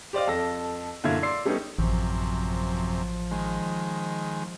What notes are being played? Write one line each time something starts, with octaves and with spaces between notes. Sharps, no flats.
G4 C5 D5 D#5 F5
F2 A4 E6 A#6
F#2 A#2 D3 E4 F5 G#6
D5 C6 E6 C7
G3 A3 B3 C#4 D#4
A1 F#2 C3 F3
D#3 G#3